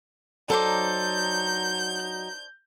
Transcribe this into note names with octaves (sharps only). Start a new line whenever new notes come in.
F#3 D#4 A4 C5 D5 G6